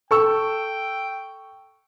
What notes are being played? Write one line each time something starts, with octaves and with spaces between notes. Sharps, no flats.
A4 G5 C#6 E6